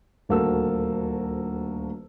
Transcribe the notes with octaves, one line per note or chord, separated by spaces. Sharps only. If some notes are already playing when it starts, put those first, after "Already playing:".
D#1 D2 A#3 F#4 A4 E6